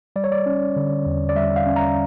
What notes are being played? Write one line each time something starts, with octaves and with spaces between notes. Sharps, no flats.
G3 D5
C#5
D5
C#4
D3
E2
D5
G3 E5
F5
C#4
A#5